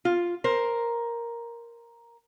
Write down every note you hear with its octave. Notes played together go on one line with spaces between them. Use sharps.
F4
A#4 C5